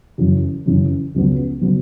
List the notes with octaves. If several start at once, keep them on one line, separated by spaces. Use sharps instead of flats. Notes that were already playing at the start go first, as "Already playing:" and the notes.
F#2 C#3 E3
F#2 C#3 E3
C#2 C#3 F#3 B3
C#3 F#3 B3